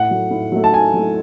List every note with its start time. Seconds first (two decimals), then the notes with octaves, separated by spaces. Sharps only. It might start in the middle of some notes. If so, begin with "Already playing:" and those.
Already playing: A2 F#5
0.11 F#3 A3
0.31 A2
0.52 F#3 A3
0.64 A5
0.73 A2 G#5
0.94 F#3 A3